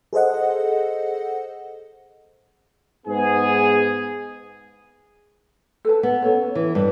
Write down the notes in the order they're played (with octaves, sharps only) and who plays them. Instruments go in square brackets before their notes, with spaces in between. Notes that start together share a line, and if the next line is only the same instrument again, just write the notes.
[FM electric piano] G#4 A4 C5 D#5 F#5
[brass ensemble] G#2 B3 G#4
[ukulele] A4 B4 A5
[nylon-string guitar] B3
[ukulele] C#4 A4 C#5
[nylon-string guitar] E3
[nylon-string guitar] G2 [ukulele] B4 D5